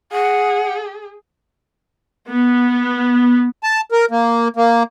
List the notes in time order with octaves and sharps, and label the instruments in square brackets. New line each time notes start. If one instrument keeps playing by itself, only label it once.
[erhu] G#4 [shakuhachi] F#5
[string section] B3
[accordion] A5
A#4
A#3
A#3